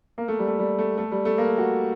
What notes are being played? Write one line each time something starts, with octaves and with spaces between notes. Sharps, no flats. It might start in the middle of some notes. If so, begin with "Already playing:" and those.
A#3
A3
G3
A3
G3
A3
A3
G3
A3
A#3
F#4